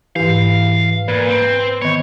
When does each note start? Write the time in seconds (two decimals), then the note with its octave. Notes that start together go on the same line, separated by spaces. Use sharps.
0.16 G#2 E3 G4 F5
1.08 A#2 B4
1.28 C4
1.82 D#3 B3 C#5